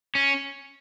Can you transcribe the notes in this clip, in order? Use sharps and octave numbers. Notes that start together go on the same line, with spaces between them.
C#4